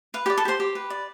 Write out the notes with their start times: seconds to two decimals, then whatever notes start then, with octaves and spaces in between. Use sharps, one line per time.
0.14 B4 F5
0.26 G4 G5
0.30 D5
0.37 A4 A5
0.45 G4 C5 C6
0.60 G4
0.75 B4
0.90 D5